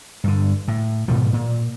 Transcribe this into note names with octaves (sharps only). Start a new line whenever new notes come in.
G2 D3
A2
G#2 B2 D#3 F3
A#2